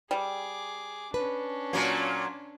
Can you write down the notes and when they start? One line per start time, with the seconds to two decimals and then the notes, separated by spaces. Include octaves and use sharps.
0.11 G3 G#4 D6
1.14 C#4 D4 B4
1.73 A#2 F#3 A#3